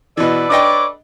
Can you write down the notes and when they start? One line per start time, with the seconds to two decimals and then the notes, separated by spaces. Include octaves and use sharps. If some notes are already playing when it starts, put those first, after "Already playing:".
0.17 B2 E3 A4 B4 D5
0.50 D4 C#5 D#5 G5 D6